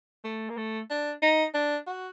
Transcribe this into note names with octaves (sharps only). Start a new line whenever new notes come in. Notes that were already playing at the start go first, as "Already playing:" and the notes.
A3
A#3
A3
D4
D#4
D4
F#4